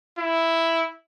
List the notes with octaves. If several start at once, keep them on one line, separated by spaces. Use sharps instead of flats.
E4